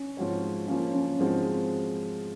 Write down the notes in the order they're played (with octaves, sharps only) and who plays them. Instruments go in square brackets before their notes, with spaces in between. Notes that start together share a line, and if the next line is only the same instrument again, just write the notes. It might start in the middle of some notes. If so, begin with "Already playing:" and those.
Already playing: [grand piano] C#4
[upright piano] G#2 F3 C4 F#4 C#5
[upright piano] F3 A#3 F4 [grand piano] C#4
[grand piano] C#4
[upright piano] G#2 F3 G#3 D#4 F#4 [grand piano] C4